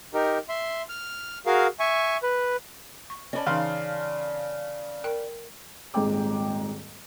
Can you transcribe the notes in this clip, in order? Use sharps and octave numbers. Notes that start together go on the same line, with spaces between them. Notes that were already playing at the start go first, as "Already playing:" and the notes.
D#4 G4 A#4
E5 C6
F6
F#4 G#4 A#4 F5
E5 G#5 C#6
B4
C#6
C#4 D5 D#5 A5 B5
C#3 E3 D#4 F5 C6
A#4 G5
D#1 G#2 G#3 C4 G5 D6